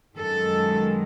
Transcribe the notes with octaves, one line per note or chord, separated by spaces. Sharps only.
F#2 D#3 G#3 A4